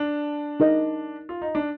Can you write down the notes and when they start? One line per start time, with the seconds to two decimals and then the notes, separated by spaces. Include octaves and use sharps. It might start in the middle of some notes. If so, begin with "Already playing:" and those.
Already playing: D4
0.60 D#4 A#4 D#5
1.29 F4
1.42 D#4
1.55 D4